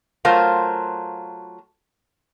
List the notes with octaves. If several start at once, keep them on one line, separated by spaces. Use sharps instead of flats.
F#3 A3 F4 A#4 C5 F5